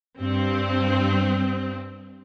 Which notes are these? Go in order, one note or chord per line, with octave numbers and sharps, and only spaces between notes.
G2 C4